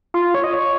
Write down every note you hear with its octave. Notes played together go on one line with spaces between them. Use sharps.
F4
C#5
D#5
C#5